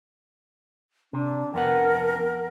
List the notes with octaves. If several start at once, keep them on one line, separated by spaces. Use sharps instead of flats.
C3 D4
F2 B3 A#4 F#5